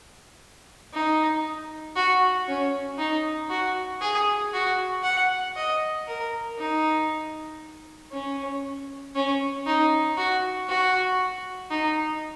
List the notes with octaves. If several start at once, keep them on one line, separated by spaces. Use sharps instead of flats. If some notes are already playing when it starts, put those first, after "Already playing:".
D#4
F#4
C#4
D#4
F#4
G#4
F#4
F#5
D#5
A#4
D#4
C#4
C#4
D#4
F#4
F#4
D#4